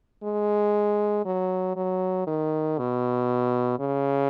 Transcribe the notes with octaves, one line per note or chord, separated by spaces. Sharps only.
G#3
F#3
F#3
D#3
B2
C#3